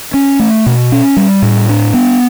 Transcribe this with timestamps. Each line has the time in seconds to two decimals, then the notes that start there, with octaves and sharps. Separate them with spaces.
0.14 C#4
0.39 A3
0.66 B2
0.92 C#4
1.17 G3
1.42 A2
1.69 D4
1.94 B3